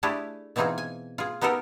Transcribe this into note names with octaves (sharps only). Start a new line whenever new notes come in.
A3 D4 E4 G4 G#4
B2 E3 C4 D#4 F4 G#4
G#5
F4 G#4
B3 D#4 G4 A4 A#4